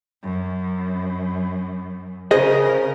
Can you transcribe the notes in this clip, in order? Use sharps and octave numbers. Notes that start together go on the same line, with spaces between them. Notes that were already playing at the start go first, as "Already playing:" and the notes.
F#2
C#3 G#4 A#4 C5 D#5